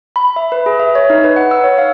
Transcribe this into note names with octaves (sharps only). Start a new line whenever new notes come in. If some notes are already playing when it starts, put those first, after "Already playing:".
B5
E5
B4
G#4
E5
C#5
D#4
B4
F#5
E6
C#5
F5